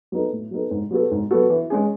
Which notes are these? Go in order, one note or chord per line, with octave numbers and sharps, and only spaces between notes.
F#3 B3 D#4 A4
A2
F#3 B3 D#4 A4
G#2
F#3 B3 F#4 A4
G#2
F#3 B3 F#4 A4
E3
G#3 C#4 G#4